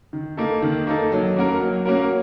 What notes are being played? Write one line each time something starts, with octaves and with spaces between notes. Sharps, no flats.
D#3
A#3 D#4 A4
D#3
A#3 D#4 A4
F#3
A#3 C#4 F#4 A#4
F#3
A#3 C#4 F#4 A#4